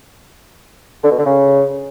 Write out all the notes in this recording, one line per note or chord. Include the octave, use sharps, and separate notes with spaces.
D3
B2
D3
C#3